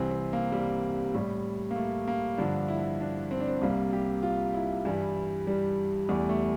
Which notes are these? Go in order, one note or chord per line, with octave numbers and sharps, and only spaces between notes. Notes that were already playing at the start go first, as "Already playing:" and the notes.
Already playing: C2 C3 E3 C4
C4
A#3
G3
A2 G3
A#3
A3
A#3
G2 D3 F3 D4
E4
D4
C4
D4
C4
C2 C3 G3 A#3
G4
F4
E4
G2 E3 G3
G3
E2 E3 G3 A3
A3